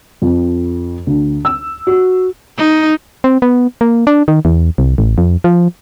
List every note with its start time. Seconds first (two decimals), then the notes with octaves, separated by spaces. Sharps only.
0.22 F2
1.07 D2
1.45 E6
1.87 F#4
2.57 D#4
3.24 C4
3.42 B3
3.81 A#3
4.07 D4
4.28 D#3
4.45 E2
4.78 C2
4.98 A1
5.18 F2
5.44 F3